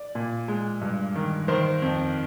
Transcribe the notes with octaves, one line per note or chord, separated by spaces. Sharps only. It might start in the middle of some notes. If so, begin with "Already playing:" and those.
Already playing: D5
A#2
G#3
G2
D#3
D#3 C5
F2